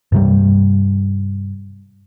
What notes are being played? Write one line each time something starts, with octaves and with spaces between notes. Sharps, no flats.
G2 C3 G3